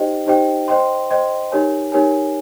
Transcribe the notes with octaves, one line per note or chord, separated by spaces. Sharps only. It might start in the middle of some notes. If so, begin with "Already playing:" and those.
Already playing: D#4 G4 C5 D#5 G5
D#4 G4 C5 D#5 G5
C5 D#5 G5 C6
C5 D#5 G5 C6
D#4 G4 A#4 C#5 G#5
D#4 G4 A#4 C#5 G#5